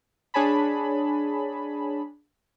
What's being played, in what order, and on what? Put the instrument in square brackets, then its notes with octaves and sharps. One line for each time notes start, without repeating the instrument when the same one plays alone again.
[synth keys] D4 G#4 C#5 G#5 A5 B5